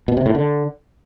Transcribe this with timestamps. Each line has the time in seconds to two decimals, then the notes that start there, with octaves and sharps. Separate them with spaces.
0.08 B2
0.17 C3
0.26 A2
0.35 D3